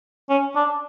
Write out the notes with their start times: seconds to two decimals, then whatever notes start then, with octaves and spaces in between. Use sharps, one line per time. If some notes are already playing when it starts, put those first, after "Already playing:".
0.30 C#4
0.55 D4